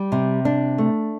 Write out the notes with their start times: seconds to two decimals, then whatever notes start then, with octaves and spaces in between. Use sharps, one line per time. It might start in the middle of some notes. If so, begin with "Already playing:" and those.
Already playing: G3
0.12 C3
0.45 D4
0.78 A3